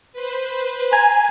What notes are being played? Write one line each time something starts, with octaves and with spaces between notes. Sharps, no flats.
B4 C5
G#5 A#5 G#6